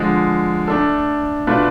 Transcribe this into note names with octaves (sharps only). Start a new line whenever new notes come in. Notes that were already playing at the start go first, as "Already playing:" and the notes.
Already playing: D3 F3 G#3
A3 D4 A4
B2 A3 D4 F4 B4